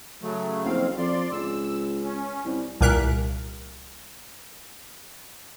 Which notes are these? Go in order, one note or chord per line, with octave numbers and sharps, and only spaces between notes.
C#3 F#3 A3
F#1 F2 C4 F5
F2 D5 C6
C#2 E6
C#4
C2
C2 A#2 A#4 F#6 B6